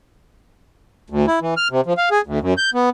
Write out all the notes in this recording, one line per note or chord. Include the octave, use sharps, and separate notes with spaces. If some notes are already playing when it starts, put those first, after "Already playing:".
D2
E4
E3
F6
C3
F3
F5
G#4
D2
F#2
G6
B3